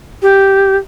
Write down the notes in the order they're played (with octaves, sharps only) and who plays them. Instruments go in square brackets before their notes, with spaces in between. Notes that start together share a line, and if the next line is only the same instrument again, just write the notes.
[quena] G4